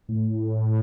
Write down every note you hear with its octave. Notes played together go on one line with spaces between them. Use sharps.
A2